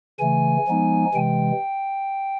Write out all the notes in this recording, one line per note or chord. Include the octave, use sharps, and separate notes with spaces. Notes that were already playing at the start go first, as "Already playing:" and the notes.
C#3 E3 A3 G#5
F3 G#3 B3 D#4
C3 E3 G#3 G5